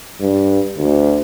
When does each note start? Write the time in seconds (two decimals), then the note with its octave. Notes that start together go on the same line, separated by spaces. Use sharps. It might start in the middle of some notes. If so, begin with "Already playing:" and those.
0.21 G2
0.77 D2